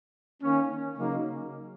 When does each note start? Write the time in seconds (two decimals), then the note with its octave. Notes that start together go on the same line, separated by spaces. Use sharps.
0.41 D#3 A#3 C#4
0.95 C#3 F#3 A#3 D#4